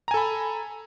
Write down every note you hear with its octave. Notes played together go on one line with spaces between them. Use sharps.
A4 G#5 A#5 B5